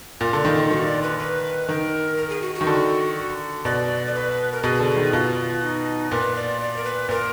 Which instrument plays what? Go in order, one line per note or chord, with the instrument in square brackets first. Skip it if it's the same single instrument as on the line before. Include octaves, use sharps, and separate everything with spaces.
[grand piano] A#2 [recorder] F4
[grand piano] D3
D#3
D#3
[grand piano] D#3 [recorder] F#4
[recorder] D5
B4
B4
[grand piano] D#3 [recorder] A#4
[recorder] A#4
G#4
F#4
F#4
[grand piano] D#3
D3
[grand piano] B2 [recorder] D5
[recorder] D5
B4
A#4
[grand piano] B2 [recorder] G#4
[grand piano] D3
D#3
[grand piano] B2 [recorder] F4
[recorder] D#4
[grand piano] A#2 [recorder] B4
[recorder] D5
D5
A#4
B4
[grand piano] A#2 [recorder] A#4